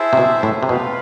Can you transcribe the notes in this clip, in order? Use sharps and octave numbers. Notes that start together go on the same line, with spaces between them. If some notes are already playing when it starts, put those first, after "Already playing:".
Already playing: E4 G#4 C5 E5 A5
C3
B2
A2
C3
B2 C4 F4 B4 F5